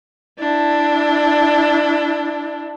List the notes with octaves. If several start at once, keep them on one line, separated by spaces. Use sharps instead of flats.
D4 E4